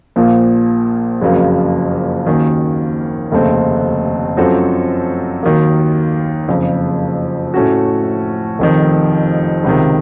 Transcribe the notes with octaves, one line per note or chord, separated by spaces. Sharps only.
A#1 A#2 F3 A#3
F#1 F2 C#3 F#3 A#3
D#2 D#3 A#3 C#4 F#4
F1 D#2 C#3 A3 C4
F#2 F3 C4 F#4 A4
D#2 D#3 F#3 A#3
F#1 F2 C#3
A2 A3 C#4 F#4
F1 F2 D#3
C#2 C3 D#3